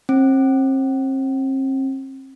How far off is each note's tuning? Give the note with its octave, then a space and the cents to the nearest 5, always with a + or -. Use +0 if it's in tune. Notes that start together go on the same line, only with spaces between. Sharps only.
C4 +40